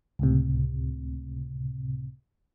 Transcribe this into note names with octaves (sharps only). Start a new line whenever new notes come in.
C#2 A2 C3